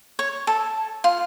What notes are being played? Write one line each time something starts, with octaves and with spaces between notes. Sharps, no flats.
C#5
A4
F4